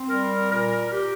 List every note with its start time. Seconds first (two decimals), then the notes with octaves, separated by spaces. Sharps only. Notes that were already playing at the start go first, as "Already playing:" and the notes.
Already playing: C4
0.08 G3 A#4
0.50 A#2 A#4
0.91 A#2 G4